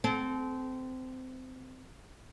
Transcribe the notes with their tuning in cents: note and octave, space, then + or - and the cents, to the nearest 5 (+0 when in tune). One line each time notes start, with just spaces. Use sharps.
C4 -20 A4 -35